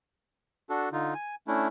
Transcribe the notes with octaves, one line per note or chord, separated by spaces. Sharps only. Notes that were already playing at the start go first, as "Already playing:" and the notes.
D4 F#4 A4
D3 D#4 F4
G#5
A3 C#4 D4 E4